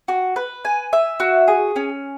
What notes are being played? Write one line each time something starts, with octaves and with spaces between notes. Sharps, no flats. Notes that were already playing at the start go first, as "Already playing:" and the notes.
F#4
B4
G#5
E5
F#4
G#4
C#4